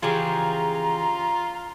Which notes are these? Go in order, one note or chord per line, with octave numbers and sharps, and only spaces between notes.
C#3 E3 F3 F4 G4 G#4 A#5